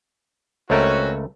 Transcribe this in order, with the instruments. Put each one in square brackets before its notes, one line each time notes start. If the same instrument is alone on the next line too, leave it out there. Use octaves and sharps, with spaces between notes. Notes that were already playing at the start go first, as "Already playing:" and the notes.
[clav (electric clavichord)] C#2 A3 A#4 [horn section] C4 C#4 F#4